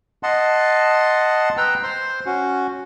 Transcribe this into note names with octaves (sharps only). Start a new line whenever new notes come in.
D#5 F#5 A5 C6
B4 G5 A#5 E6
C5 C6
C#4 F#4